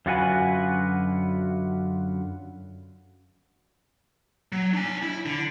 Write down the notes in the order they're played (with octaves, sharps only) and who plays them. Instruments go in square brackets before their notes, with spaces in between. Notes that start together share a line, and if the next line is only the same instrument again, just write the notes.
[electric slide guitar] F#2 D3 F4 F#4 B4 G#5
[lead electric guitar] F#3
D4 G#5
E4
D3